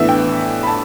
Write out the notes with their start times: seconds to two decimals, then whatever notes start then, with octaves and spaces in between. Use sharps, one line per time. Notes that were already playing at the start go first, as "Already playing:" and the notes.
Already playing: A2 E3 B3 D4 E5
0.09 G5
0.63 B5
0.67 A5